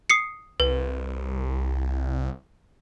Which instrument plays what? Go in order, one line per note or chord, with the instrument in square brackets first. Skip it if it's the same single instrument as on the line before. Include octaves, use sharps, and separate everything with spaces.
[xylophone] D#6 C7 C#7
[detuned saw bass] C2 [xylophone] B4